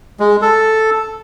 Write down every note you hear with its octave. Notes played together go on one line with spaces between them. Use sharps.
G#3
A4